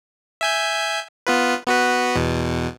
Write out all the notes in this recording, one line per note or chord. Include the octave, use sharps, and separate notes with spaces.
E5 G#5 G6
B3 F4 B4
B3 F#4 B4
E2 B2